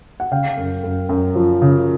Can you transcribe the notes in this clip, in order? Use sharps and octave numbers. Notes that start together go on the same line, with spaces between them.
F#5
C#3 F5 G5
F#2
F#2
F#2
F3
C#3